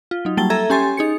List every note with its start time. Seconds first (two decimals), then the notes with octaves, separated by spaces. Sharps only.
0.11 F4
0.25 F#3 D#4
0.37 F#3 G3 A#3 A5 A6 G7
0.50 A4 E5 A#5 G#6
0.70 C#4 G4 G#5 C6 A6
0.97 D#4 G#4 C#7